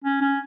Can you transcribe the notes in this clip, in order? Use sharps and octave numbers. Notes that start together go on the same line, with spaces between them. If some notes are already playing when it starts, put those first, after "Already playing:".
C#4
C#4